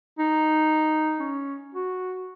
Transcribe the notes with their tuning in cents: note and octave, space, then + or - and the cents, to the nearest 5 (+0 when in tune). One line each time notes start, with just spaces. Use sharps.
D#4 -5
C#4 +5
F#4 -5